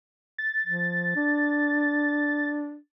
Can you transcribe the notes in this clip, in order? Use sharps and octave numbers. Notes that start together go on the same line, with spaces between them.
A6
F3
D4